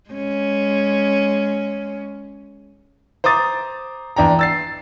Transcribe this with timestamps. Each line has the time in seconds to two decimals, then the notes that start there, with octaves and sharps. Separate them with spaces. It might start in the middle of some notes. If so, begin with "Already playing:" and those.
0.10 G#3 C#4
3.24 C5 A#5 D6 D#6 A6
4.16 E2 D4 G5 A#5
4.39 E6 A6 C7